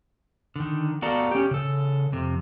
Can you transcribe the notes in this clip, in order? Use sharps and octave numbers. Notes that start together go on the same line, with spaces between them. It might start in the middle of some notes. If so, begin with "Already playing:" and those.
D3 D#3
B3 F#4 A4 D5 F5 A#5
C#4 G4
C#3 A4
F2 C3